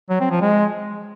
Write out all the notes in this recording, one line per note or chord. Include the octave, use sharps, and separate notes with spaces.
F#3
C4
F3
G#3